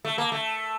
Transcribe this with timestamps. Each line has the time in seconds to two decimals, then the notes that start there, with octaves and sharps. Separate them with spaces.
0.05 A3
0.18 A#3
0.32 A3